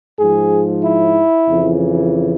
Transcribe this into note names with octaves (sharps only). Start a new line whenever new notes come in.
G#2 G#4
F3
E4
F2 C#3 E3